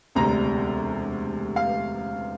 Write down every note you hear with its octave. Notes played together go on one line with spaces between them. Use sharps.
E1 D2 C3 A#5
F5